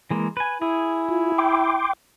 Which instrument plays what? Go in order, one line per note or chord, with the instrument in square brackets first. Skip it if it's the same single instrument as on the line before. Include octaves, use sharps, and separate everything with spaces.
[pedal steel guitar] E3 G#3 A#3
B4 G#5
[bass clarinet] E4 [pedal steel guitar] G#4
[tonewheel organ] F4
G5 C6 D6